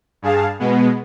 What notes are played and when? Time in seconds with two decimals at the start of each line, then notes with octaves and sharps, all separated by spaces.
0.22 G2 G#4 F5 A5
0.59 B2 G#3 B3